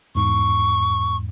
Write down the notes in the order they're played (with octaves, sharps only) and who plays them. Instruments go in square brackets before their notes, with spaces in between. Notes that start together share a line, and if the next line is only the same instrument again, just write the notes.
[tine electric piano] E2 G#2 [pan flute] C#6